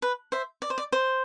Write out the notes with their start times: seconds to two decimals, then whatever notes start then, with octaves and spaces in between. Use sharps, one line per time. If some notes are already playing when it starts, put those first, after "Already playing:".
0.02 B4
0.32 C5 E5
0.62 D5
0.70 C5
0.78 D5
0.92 C5